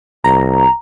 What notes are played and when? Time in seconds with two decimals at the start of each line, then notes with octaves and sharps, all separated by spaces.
0.24 C2 A#5